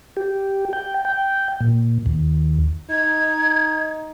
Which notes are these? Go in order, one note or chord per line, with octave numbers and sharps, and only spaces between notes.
G4
G5
G5
A#2
D#2
D#4 G#6